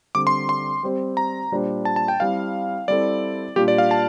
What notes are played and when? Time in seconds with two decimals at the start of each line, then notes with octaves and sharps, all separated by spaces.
0.15 D3 G3 C4 D6
0.27 C6
0.49 C6
0.83 G3 C4 G4 C5
1.17 A#5
1.52 A#2 G3 D4 G4 C5
1.85 A5
1.96 A5
2.08 G5
2.20 G3 C4 E4 F5
2.88 G3 C4 E4 A4 D5
3.56 A#2 G3 D4 F4 G4
3.68 D5
3.78 F5
3.91 A5